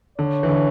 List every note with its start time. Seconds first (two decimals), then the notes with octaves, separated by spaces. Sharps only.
0.18 D3 C#5
0.43 E3
0.49 D3